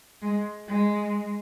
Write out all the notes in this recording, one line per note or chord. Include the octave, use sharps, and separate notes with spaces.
G#3
G#3